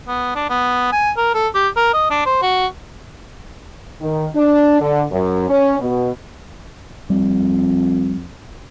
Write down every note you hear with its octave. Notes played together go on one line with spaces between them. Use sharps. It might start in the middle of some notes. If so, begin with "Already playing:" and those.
B3
D4
B3
G#5
A#4
A4
G4
A#4
D#5
D4
C5
F#4
D#3
D4
D3
F#2
C#4
B2
F2 G3